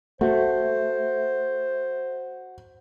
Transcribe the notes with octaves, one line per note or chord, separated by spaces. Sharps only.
A3 F#4 C5